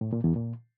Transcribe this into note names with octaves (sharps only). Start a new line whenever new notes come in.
A2
A#2
E2
A#2